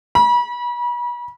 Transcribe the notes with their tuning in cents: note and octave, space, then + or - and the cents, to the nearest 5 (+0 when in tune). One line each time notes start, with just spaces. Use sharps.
B5 -35